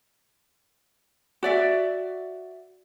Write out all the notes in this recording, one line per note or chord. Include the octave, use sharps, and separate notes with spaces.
F#4 D5 E5